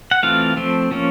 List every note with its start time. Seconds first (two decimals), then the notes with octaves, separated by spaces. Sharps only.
0.11 F#5
0.23 E3 A3 C4 F4 F5
0.57 F3 A3 C4
0.91 F3 A#3 C#4